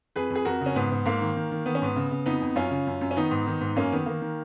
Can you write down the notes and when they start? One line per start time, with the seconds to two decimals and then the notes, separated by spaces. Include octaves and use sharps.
0.16 F2 G#4 B4
0.30 F2
0.35 G#4
0.45 F2 F#4 A#4
0.61 C#3
0.66 C#4
0.76 G#2 B3
0.91 G#2
1.05 G#2 A#3
1.21 D#3
1.36 D#3
1.52 D#3
1.66 D#3 B3
1.75 C#4
1.82 G#2 B3
1.96 C#3
2.11 C#3
2.26 F2 B3 D#4
2.42 F2
2.56 F#2 C#4 F4
2.71 C#3
2.87 F#2
3.01 F#2
3.11 C#4
3.16 D#3 B3 D#4
3.31 G#2
3.46 D#3
3.61 G#2
3.76 F#2 A#3 C#4
3.92 D#3 B3
4.06 D#3 A#3
4.22 D#3